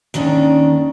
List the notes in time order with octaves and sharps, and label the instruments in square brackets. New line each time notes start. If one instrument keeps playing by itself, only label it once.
[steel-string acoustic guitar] D#2 D#3 C#4 D4